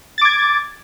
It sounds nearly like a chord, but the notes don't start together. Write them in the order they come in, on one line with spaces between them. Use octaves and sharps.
A6 D6 G#6